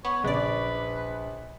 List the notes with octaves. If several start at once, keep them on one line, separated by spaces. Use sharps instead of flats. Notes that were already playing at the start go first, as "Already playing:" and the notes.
B3 C#5
A#1 C#3 B4 D5